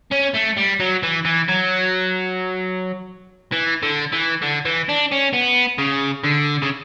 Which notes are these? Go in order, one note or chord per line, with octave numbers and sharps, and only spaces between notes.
C#4
A3
G3
F#3
E3
E3
F#3
E3
D3
E3
D3
E3
D4
C#4
B3
C#3
D3
C#3